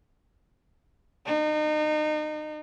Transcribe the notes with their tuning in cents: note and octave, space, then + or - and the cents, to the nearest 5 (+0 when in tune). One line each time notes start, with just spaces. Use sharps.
D#4 -35